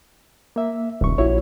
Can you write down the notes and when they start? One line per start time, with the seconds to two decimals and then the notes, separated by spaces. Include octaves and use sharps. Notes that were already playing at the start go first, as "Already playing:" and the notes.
0.56 A#3 E5
1.01 D#1 C2 G2 C#6
1.18 A#1 E4 F#4 C#5